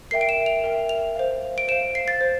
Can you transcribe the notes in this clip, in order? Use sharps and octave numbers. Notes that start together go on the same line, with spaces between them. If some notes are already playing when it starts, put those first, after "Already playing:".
A#4 E5 G5 C7
D7
E7
F7
A#4 E5 G5
F7
C5 F5
D7
C5 F5 E7
C7
A6
C5